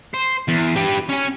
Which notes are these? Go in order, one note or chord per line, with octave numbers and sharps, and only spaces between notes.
C5
E2
G4 B4
C#4 G#5